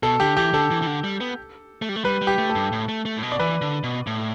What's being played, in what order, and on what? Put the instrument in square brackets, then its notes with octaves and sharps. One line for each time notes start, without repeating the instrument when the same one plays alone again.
[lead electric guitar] B2 [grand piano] A4
[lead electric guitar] D3 [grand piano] G4
[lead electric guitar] E3 [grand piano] G4
[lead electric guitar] D3 [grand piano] A4
[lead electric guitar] E3
E3
D3
G3
B3
A3
G3
A3
[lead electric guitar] G3 [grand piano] B4
[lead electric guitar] G3
[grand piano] G4
[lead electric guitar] A3
[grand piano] A4
[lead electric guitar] G2
A2
A3
A3
A2
B2
[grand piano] D5
[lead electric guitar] E3 [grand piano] B4
[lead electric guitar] D3
B2
A2